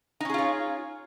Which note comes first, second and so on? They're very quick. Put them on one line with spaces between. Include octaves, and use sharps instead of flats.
D#4 C#4 G#4 F4 C#5